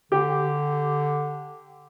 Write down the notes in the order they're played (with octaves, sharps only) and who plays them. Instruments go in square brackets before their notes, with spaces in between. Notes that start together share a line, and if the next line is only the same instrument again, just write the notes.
[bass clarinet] D3 [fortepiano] G4